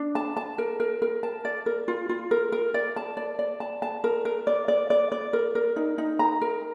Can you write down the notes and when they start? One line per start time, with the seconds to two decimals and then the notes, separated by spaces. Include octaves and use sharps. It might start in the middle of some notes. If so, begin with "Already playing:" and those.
Already playing: D4
0.15 A5
0.37 A5
0.58 A#4
0.80 A#4
1.02 A#4
1.23 A5
1.45 D5
1.66 A#4
1.88 F4
2.09 F4
2.31 A#4
2.52 A#4
2.74 D5
2.96 A5
3.17 D5
3.39 D5
3.60 A5
3.82 A5
4.04 A#4
4.25 A#4
4.47 D5
4.68 D5
4.90 D5
5.12 D5
5.33 A#4
5.55 A#4
5.76 D#4
5.98 D#4
6.19 A#5
6.41 A#4